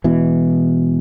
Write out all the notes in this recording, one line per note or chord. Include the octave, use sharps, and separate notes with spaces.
E1 E2 B2 E3